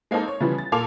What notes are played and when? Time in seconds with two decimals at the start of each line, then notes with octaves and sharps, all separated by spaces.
0.11 G#3 A#3 C4 D#4 A4
0.28 C#5
0.40 C#3 E3 F3 G3 B3
0.58 A6
0.72 A#2 A#3 A4 D6 F7